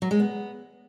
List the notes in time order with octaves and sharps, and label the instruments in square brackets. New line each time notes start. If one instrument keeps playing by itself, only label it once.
[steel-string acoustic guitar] F#3
G#3
B3